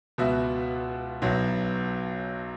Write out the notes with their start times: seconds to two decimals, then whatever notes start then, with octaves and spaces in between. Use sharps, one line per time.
0.18 C#2 B2 B3 F#4 E5
1.22 B1 B2 F#3 B3 E4